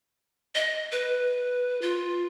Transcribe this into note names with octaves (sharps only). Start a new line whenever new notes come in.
D#5
B4
F4